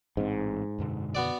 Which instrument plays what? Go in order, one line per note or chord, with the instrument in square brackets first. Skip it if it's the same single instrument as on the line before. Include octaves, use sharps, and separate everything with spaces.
[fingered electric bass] A1 C4 [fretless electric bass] G#2
[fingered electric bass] F#2 B2 D3
[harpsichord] B3 F#4 D5